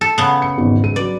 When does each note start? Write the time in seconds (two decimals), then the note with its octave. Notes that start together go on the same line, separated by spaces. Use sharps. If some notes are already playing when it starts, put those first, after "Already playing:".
0.01 A4
0.18 C#3 B3
0.42 C#7
0.57 G#1 E2 G#2
0.83 G#3 D#7
0.96 F#3 B4 D5